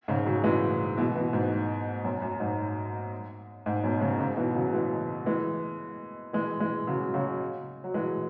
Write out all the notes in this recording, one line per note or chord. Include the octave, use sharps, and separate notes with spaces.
G#2 C#3
C#3 F#3
E3 G#3
B2 E3
B2 E3
G#2
F#2 B2
F#2
G#2
G#2
F#2 B2
G#2 C#3
G#2 C#3
B2 E3
C#3 F#3
E3 G#3
E3 G#3
E3 G#3
E3 G#3
C#3 F#3
C#3 F#3
F#3
E3 G#3